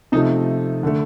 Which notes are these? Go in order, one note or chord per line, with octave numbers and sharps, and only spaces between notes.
C3 F3 A3 D#4
D3 A3